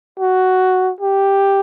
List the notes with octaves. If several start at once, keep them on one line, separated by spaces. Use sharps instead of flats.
F#4
G4